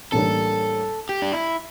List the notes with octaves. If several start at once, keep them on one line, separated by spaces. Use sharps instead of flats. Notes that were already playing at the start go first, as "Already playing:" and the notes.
A1 A2 G3 A#3 D4 A4
G4
D4
E4